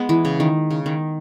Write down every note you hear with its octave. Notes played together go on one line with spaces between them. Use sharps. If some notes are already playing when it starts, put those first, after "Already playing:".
Already playing: G#3 B3
E3
C#3
D#3
C#3
D#3